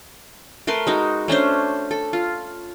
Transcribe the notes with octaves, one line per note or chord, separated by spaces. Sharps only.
A3 A#4 B4 C6
G#3 D#4 F#4
A3 C#4 D4 C5
A4
F4